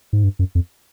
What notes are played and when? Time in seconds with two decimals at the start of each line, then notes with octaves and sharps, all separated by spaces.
0.13 G#2
0.24 G2
0.39 F#2
0.55 F2